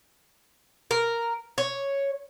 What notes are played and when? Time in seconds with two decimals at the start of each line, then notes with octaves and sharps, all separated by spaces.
0.91 A#4
1.58 C#5